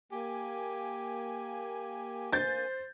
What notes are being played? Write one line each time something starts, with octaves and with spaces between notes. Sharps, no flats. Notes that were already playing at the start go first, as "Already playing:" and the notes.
A#3 G4 G#5
C5 G6 A6